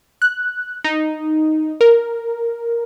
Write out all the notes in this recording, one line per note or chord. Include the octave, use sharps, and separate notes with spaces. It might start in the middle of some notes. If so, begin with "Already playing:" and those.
F#6
D#4
A#4